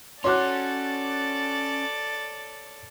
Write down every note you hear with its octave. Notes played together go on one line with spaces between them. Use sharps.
C#4 F#4 A4 C#5 D5 C6 D6 F#6